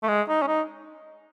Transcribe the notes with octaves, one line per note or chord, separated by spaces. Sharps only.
A3
G#3
D#4
C#4
D#4